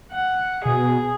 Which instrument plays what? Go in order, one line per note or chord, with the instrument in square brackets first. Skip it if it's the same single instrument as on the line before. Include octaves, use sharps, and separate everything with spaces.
[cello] F#5
[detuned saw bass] B2 [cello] G#4